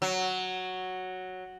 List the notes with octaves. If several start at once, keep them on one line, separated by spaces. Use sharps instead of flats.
F#3